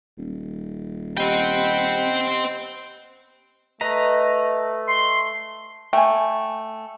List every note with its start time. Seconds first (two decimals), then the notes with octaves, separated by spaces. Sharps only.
0.17 D#1
1.17 G4 C5 D#5 F#5 G5 B5
3.81 A3 B4 D#5 A#5
4.87 C6
5.93 A3 G5 G#5